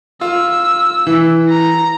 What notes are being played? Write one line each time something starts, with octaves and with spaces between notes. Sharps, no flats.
F4 E6
E3
A#5